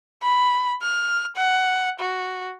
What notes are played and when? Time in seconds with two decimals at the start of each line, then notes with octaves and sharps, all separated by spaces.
0.23 B5
0.82 F6
1.36 F#5
2.00 F#4